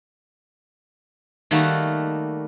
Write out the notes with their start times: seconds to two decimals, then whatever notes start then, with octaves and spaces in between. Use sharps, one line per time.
1.51 D#3 G3 A3 A#3 F#4